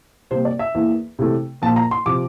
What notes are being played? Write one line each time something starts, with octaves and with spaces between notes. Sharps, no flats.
C3 G3 A#3 C5
D5
E5
E2 E3 A#3
C3 E3 A3
A#2 F3 A#3 A5
A#5
C6
C3 F3 D6